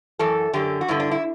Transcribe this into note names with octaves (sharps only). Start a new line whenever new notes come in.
F#2 E3 A4
F#2 D3 G4
F#4
G2 D3 E4
D4
E4